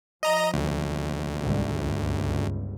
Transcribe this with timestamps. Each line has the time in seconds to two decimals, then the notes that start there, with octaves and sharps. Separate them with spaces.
0.23 F3 D#5 A#5
0.54 D2
1.39 C2 G#2 D3
1.75 G1 C#2 G2